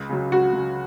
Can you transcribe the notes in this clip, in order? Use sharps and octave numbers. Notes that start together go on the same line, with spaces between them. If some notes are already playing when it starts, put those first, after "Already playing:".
Already playing: C#2
C#3 F#3
C#2 F#4
C#3 F#3